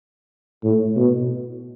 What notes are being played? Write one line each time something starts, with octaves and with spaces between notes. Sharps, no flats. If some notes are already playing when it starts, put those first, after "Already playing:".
A2
B2